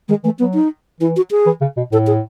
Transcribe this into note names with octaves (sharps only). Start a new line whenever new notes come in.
D#3 G#3
E3 A3
F#3 B3
D#4
E3 E4
F#4
G#4
E3
C#3
B2
A2 A4
G#4